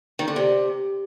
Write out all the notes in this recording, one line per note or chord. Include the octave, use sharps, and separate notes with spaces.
D#3
D3
C3